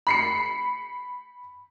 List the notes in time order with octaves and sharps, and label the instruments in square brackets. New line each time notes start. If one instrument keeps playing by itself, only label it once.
[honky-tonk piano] B5 C7 C#7